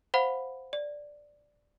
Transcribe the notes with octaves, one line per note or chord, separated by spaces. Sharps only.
C5 F5 F#5 B5
D5